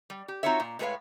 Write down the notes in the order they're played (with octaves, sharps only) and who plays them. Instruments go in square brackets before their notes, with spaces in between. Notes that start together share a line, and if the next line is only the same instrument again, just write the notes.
[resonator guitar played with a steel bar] G3
G4
C4 D#4 F4 F#4 C#5 E5
A#2
A2 G#3 G#4 B4 C#5 F5